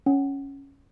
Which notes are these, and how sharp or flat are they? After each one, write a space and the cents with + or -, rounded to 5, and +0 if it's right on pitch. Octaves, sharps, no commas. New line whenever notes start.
C#4 +0 F#5 +20